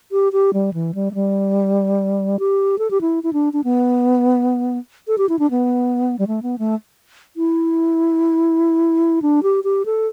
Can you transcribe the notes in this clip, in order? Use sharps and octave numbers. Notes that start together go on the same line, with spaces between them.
G4
G4
G3
E3
G3
A3
G3
G4
A4
G4
E4
E4
D4
D4
B3
A4
G4
E4
D4
B3
G3
A3
B3
A3
E4
D4
G4
G4
A4